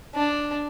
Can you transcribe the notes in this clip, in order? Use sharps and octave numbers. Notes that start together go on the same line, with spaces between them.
D4